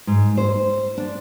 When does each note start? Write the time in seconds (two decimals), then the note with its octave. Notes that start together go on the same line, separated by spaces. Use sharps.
0.07 G#2
0.37 C5
0.98 D4